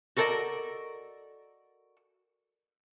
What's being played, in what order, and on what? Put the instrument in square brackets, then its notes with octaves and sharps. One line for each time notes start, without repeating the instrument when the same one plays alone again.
[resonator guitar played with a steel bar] F#4 A4 A#4 C5 D5 D#5